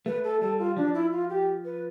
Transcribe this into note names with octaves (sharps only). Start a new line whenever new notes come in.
A3 B4
A4
G3 A4
F4
F3 D4
E4
F4
G4
B4